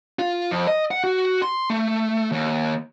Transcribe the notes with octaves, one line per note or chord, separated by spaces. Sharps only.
F4
F2
D#5
F#5
F#4
C6
A3
D#2